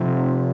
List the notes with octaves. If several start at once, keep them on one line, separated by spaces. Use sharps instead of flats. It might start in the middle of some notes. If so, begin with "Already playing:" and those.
Already playing: F2 C3